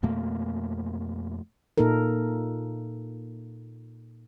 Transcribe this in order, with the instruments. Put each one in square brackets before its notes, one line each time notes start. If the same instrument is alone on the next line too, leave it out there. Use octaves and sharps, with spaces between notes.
[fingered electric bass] F2 B2 A3 A#3
[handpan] A#2 A#3 D#4 A4 A#4